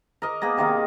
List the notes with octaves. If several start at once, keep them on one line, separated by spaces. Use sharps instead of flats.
A#4 D#5 D6
A#3 B3 G#4 A#5
C3 D#3 A#3 F5